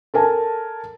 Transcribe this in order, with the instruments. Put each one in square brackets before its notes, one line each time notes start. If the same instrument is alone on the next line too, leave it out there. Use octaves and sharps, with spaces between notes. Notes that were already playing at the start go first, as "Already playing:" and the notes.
[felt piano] A4 A#4 G#5 A5